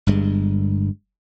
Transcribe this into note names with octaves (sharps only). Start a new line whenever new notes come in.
G1 G2 G#3